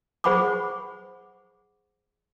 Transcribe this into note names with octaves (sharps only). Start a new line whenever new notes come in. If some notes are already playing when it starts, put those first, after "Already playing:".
G#4 C5 F#5 B5 C#6 D6